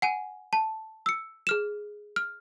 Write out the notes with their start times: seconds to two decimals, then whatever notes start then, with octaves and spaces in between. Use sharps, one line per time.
0.02 F#5 G#5 D#7
0.53 A5
1.06 E6 C#7
1.47 G#4 F6 E7
2.16 F6